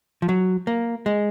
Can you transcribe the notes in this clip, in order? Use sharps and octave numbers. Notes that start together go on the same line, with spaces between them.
F3
F#3
A#3
G#3